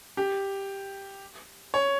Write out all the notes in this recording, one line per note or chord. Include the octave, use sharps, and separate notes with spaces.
G4
C#5